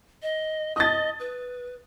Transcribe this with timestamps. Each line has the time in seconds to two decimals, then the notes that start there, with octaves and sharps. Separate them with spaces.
0.23 D#5
0.76 D#5 D#6 A6
1.20 B4